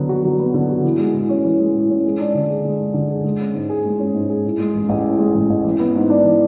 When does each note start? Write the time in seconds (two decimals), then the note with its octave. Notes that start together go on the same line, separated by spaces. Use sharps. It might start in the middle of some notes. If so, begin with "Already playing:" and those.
Already playing: D3 F#3 B3
0.09 F#4
0.24 F#3
0.39 B3
0.54 D3
0.69 F#4
0.84 E3
0.99 G#3
1.14 A2
1.29 C#4
1.44 E3
1.59 G#3
1.74 A2
1.90 C#4
2.05 G#3
2.20 D4
2.34 D3
2.49 G#4
2.64 G#3
2.80 D4
2.94 D3
3.09 G#4
3.24 G#3
3.39 C#4
3.54 G#2
3.69 G#4
3.85 G#3
3.99 C#4
4.14 G#2
4.29 G#4
4.45 A2
4.59 G#3
4.75 A1
4.89 A1
5.05 A2
5.19 G#3
5.35 A1
5.50 A1
5.64 E3
5.79 B3
5.95 G#2
6.10 D4
6.25 E3